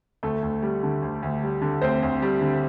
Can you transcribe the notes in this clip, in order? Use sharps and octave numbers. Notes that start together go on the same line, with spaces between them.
D2 A3 A4
D2
G3
D3
D2
D2
G3
D3
D2 C4 C5
D2
G3
D3